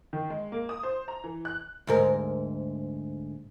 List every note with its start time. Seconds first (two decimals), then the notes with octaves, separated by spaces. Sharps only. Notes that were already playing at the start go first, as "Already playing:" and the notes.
0.13 D#3
0.30 G#3
0.52 A#3
0.69 D#6
0.83 C5
1.08 A#5
1.24 E3
1.45 F#6
1.87 D2 G#2 A#4